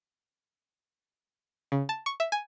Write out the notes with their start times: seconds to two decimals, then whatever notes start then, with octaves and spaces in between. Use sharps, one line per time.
1.72 C#3
1.89 A5
2.06 C#6
2.20 E5
2.32 G#5